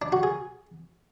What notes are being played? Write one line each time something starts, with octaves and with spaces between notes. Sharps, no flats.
D4
F#4
G#4